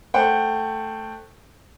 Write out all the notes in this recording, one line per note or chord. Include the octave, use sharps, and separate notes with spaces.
A3 C5 F#5 G5